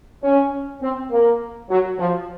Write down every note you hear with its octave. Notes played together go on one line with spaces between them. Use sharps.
C#4
C4
A#3
F#3
F3